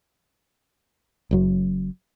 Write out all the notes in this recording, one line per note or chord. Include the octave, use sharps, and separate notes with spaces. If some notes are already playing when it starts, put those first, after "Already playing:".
F#1 F#2 F#3